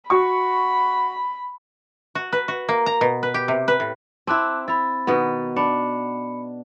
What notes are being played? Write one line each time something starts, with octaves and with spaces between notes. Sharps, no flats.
F#4 B5 C#6
F#4
B4
F#4
A#3
A#5
B2
B4
G4
C3
B4
A2
C4 E4 A5 D6 F#6
E4 B5 A6
B2 D#3 B3
D4 B5 C#7